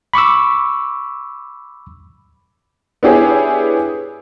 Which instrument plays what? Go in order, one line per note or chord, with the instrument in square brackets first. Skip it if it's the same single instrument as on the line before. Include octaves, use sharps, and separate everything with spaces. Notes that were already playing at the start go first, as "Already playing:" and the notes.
[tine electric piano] B5 C#6 D6 E6
[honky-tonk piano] B3 D4 E4 G4 G#4 C#5